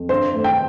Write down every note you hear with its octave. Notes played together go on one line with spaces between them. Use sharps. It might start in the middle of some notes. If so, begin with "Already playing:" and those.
Already playing: F2
G2 C5
A3
G5